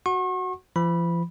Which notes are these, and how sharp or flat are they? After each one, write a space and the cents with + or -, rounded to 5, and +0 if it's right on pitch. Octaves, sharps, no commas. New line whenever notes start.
F#4 +0 F#5 +0 C#6 -40
F3 -40 B5 -10